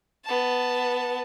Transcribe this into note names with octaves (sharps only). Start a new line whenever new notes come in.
B3 A5